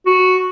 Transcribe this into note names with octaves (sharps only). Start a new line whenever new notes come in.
F#4